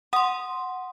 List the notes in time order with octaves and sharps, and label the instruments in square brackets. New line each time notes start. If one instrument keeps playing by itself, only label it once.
[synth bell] F#5 C6 [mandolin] D#6